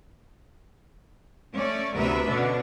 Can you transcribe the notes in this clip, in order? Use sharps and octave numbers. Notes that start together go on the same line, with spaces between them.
A3 C#4 C#5 D5
D2 C3 B3 A#4 B4 E5
B2 D3 C#4 D4